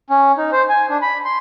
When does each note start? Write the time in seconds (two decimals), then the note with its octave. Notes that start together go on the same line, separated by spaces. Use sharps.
0.10 C#4
0.37 D#4
0.53 C5
0.69 G#5
0.90 D4
1.02 B5
1.25 C6